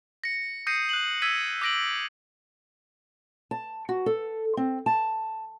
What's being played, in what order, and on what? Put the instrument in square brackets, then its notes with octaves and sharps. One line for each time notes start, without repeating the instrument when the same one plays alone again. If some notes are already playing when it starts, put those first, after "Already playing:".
[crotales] A#6 C#7
D#6 G6 A#6 C7 C#7 D#7
F#6 F#7
E6 G#6 B6 D#7
D6 F#6 A#6 D7 F#7
[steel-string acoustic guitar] A5
F#4
A4
C4
A5